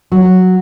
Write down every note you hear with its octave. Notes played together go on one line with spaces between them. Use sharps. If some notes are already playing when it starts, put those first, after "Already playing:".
F#3